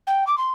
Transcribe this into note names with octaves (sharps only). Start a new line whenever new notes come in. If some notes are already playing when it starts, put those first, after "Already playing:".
G5
D6
C6